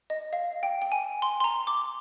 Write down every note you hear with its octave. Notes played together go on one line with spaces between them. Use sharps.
D#5
F5
G5
G5
G#5
C6
C6
A#5
D6